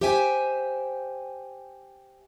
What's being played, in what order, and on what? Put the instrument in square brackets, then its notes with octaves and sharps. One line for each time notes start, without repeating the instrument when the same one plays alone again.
[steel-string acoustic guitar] G4 C5 E5 G5 G#5